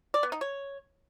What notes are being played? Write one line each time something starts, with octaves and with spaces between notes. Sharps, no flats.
D5
B3
D#4
C#5